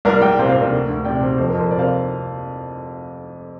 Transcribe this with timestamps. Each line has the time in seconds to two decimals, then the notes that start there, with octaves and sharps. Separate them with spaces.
0.05 C2 A#4 D5
0.21 C2 D5 G5
0.39 C3 C5 F5
0.49 C5 F5
0.56 C3 A#4 D5
0.71 D2
0.88 D2
1.05 C3 D5 G5
1.21 C3 C5
1.38 F2 C5
1.48 A#4
1.54 F2
1.60 C5
1.71 C3 A#4 D5
1.79 C5 F5